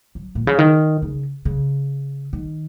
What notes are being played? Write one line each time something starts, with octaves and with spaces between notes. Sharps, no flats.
F#3
A#2
C#3
D#3
C#3
C#3
D#3